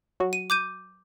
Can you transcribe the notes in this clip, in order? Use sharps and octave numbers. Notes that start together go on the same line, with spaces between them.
F#3 F#4
D#7
D6 G6 D#7